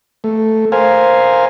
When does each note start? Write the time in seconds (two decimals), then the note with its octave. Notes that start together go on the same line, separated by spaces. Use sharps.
0.24 A3
0.72 A#4 C5 F5 G#5